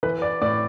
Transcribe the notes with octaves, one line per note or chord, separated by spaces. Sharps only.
E3 B4
D5
A2 D5